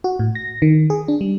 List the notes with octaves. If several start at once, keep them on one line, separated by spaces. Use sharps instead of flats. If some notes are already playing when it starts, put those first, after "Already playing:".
F#4
A2
A#6
D#3
G#4
D4
G3